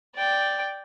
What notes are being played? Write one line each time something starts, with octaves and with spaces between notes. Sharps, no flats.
D5 G5